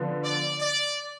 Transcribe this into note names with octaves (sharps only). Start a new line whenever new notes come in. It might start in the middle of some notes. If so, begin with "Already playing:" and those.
Already playing: D3 F3 B3
D5
D5